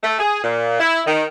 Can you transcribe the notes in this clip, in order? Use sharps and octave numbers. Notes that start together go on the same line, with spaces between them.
A3
G#4
A#2
E4
D#3